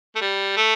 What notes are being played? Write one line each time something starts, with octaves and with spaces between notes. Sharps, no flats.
A3
G3
A3